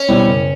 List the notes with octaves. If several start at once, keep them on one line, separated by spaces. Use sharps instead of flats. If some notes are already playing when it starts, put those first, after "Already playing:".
Already playing: C#4
B2 G3 C4 E4
F#1